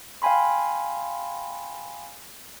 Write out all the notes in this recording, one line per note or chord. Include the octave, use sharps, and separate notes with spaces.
F5 G5 G#5 B5 C6